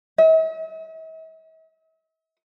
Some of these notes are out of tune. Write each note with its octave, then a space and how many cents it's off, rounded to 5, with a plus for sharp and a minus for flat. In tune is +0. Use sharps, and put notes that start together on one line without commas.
E5 -45